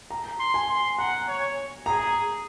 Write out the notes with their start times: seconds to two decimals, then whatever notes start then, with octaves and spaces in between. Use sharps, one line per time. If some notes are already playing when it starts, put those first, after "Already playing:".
0.11 A#5
0.40 C6
0.54 G#5
0.70 C6
0.98 F#5 A#5
1.28 C#5
1.86 G#4 A#5